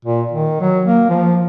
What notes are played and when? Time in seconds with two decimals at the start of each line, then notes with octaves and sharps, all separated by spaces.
0.05 A#2
0.32 D#3
0.61 F#3
0.85 A#3
1.09 F3